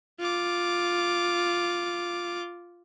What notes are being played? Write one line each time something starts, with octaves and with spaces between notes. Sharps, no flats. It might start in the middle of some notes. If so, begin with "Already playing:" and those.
F4 D6